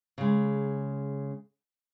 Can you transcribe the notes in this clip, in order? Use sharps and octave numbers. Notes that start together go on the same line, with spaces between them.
C#3 G#3